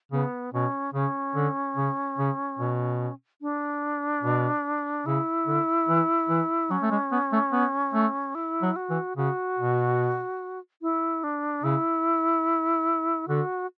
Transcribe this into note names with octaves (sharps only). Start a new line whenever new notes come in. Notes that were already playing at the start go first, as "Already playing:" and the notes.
C#3 B3
B2 C#4
C#3 C#4
D3
C#3
C#3
B2
D4
B2
C#3 E4
D3
E3
E3
F#3 C#4
A3
G#3
B3
A3
B3
A3
E4
F#3
F#4
E3
C#3 F#4
B2
E4
D4
C#3 E4
D3 F#4